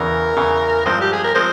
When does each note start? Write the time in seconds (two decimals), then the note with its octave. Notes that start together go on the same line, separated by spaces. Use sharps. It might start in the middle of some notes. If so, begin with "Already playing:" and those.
Already playing: E2 C#3 E3 A#4
0.37 E2 C#3 E3
0.86 G2 F3 G#3 C4 C5
1.01 G4
1.12 G#4
1.24 A#4
1.35 F3 G#3 C4 C5